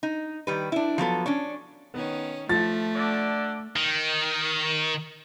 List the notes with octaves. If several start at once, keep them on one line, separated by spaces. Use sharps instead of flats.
D#4
D#3 G3 B4
D4 E4
F3 F#3 B3 A4
C#4 D4 C#5
D#3 B3 C#4
F3 A3 A6
D3 D5
D#3